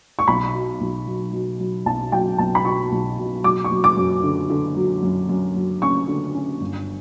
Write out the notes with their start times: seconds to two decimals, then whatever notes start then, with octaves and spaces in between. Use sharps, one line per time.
0.19 C#6
0.28 B1 B5
0.54 B2
0.81 B1
1.07 F#3
1.33 F#3
1.60 F#3
1.86 B1 A5
2.12 F#3 G5
2.38 B1 A5
2.55 B5
2.65 B2 C#6
2.92 B1
3.18 B2
3.44 F#3 D6
3.64 C#6
3.71 F#3
3.84 D6
3.97 F#2
4.23 D3
4.50 D3
4.76 F#3
5.02 F#2
5.29 F#2
5.56 F#3
5.82 C#4 C#6
6.08 D3
6.34 C#4
6.61 G1